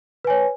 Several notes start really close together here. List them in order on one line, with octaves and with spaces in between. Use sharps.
B4 G#5 C#5